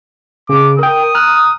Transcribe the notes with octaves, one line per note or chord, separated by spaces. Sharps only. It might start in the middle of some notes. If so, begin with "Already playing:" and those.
C#3 D6
A#4 G5 D#6
A#5 F6 F#6